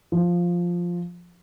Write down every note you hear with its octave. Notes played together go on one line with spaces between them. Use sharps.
F3